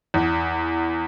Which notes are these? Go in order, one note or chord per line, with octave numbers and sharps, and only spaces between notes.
E2